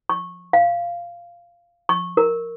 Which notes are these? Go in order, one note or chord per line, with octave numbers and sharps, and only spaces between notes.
C#6
F5
C#6
A#4